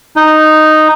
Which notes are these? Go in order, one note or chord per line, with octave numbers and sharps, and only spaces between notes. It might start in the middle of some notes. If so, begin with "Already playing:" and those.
D#4